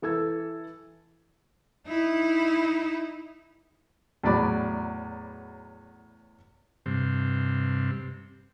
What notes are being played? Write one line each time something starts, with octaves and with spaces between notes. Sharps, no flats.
E3 A4 E6 G#6
D#4 E4
E2 A2 F#3 D5 B5 D6
G2 C3